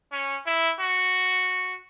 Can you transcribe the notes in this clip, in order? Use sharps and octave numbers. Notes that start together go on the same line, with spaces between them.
C#4
E4
F#4